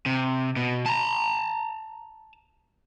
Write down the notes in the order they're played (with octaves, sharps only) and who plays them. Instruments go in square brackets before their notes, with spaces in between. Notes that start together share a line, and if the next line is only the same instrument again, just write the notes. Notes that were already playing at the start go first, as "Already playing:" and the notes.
[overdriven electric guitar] C3
B2
A5 A#5